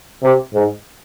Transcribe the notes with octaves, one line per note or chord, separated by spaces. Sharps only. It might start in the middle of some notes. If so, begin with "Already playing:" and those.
C3
G#2